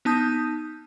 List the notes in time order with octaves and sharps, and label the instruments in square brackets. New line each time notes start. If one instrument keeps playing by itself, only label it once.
[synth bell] B3 D#4 A5 D#6 G6